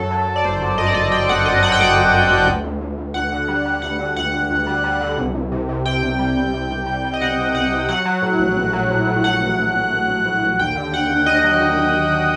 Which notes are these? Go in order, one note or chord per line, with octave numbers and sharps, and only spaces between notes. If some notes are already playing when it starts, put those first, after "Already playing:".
Already playing: F#2 F#3 A4
F#3
F#3
D5
G1 C5
F#3
F#2 D#5
D5
G1 D#5
G1 G5
G1 F#5
F#2 D#5
F#3 F#5
G5
G1 F#5
F#2
F#2
G1
D2
D2
D2
D2
D2 F#5
D3
G3
G3
D2 F#5
D3
D2 F#5
D2
D2
G3
G3
D3
C2
C2
C3
C3
C3 G5
C2
G3
C2
C3
C2
G3
G3
D#5
C2 F#5
C3
C2 F#5
C3
F#3 F#5
F#3
A2
A#1
A#1
F#3
A2
A2
F#3 F#5
A#1
A#1
A#1
A#1
A#1
A2
A#1
D#2 G5
D3
D#2 F#5
D#2
D#2 D#5
F#3
D#2
D#2